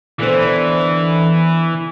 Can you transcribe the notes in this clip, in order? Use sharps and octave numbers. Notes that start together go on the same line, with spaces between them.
D3 E3 B3 C5